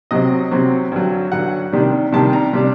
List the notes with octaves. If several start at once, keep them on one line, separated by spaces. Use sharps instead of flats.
C3 F#3 C4 D#5
C3 F#3 C4
G2 D3 F#3
G2 D3 F#3 F#5
C3 D#3 G3 D4
C3 D#3 G3 D4 A5
A#5
C3 G3 D4